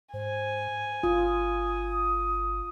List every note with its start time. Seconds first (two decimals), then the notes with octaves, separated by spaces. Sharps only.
0.14 G#2 C5 G#5
1.03 G1 F4 D#6